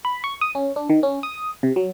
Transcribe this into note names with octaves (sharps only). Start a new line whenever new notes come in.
B5
C#6
D#6
C#4
D4
D#3
C#4
D#6
C3
F#3